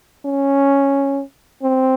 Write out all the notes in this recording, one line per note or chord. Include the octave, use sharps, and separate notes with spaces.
C#4
C4